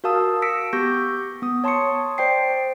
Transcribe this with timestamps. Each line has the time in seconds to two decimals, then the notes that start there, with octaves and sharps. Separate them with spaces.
0.04 F#4 A#4 F5 A5 D#6 E6
0.42 E6 A#6 B6 C#7 D7
0.73 B3 G4 C#6 G6 A#6
1.42 B3 D#6
1.64 C#5 A5 C6 C#6 D#6 C#7
2.18 C5 D5 G5 C7